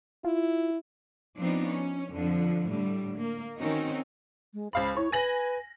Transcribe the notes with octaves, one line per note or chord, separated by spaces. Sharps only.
E4 F4
F3 B3 C4 D4 D#4
C#4
F2 D3 F3
A2 D3 G3
A#3
D#3 C4 C#4 D#4 F#4
G#3
C#2 C5 F5 B5
E4 C#5
B4 G#5 A#6 F#7